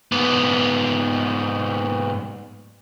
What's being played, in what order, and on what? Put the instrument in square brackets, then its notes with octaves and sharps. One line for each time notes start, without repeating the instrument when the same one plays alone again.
[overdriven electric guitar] G#2 B3